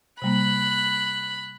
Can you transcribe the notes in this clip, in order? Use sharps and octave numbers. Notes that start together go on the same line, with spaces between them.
C3 G3 A#3 B5 F#6